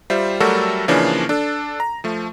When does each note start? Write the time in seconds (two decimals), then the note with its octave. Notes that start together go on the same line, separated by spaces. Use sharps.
0.10 G3 F4 C5 E5
0.40 F#3 G3 A3 F#4 A4 A#4
0.88 C#3 E3 F3 A#3 C#4 D4
1.29 D4 A4
1.80 A#5
2.04 F3 A3